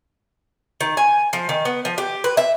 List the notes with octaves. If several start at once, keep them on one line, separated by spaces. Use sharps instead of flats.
D#3
G#5
F3
D#3
B3
F3
G4
B4
E5